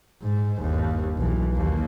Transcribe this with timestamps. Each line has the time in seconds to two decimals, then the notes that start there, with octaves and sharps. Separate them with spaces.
0.22 G#2
0.59 G1 D#2
1.18 B1 E3
1.52 D#2 A#3